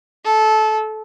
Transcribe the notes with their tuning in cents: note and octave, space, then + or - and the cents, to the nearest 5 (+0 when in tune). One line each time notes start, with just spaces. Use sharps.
A4 -20